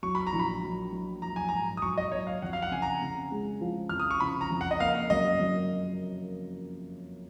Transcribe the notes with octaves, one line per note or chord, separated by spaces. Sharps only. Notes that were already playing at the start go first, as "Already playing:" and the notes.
F#3 C#6
B5
A#5
A#1
B5
F#3
F#3
F#3 A#5
G#5
G#2 A#5
D#6
F#3 C#6
D#5
F#3 C#5
F5
F2 F#5
F5
F#5
C#3 G#5
A#5
C#3
G#3
F3
F2 F6
D#6
C#6
C#3 B5
A#5
F2
F#5
D#5
A#3 F5
F#2 D#5
F#2